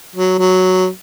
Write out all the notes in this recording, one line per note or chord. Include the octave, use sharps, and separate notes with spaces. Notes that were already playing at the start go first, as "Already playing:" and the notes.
F#3
F#3